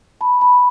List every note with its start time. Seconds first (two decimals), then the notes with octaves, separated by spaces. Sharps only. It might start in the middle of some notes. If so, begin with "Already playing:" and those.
0.21 A5 B5
0.41 A5 B5